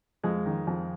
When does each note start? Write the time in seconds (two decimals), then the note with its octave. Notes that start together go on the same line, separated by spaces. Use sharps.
0.23 F2 G#3
0.46 D#3
0.67 F2